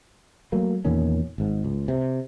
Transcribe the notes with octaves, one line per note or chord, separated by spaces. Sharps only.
F#3 A3 A#3
E2 A#2 D#3 C#4
G#1 G#2
C#2
C3